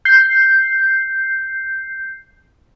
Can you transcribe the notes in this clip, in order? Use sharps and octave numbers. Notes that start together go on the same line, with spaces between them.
G6 C7